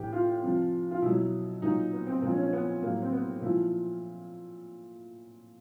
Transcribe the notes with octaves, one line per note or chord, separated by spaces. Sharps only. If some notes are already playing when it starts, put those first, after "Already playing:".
Already playing: A2 E3 G4
F4
C3 F3
F4
B2 F#3 E4
A#2 F#3 D#4
B3
C4
A#2 F3 C4
C#4
C#4
B3
A2 F#3 A#3
C4
B3
A#2 F3 E4